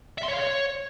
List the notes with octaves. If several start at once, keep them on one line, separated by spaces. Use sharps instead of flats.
E5
C6
C#5
F5
C#5